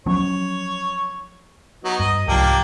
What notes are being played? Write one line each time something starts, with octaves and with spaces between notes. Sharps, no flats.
F3 F#3 C#4 C#5
F#3 B3 D#4
G2 D#5
C2 G#2 F3 A#3 D4 G4